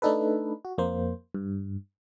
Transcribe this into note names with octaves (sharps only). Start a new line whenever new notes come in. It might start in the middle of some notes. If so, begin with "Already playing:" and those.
A3 D4 D#4 A4 B4
F#4
F2 A#3 C5
G2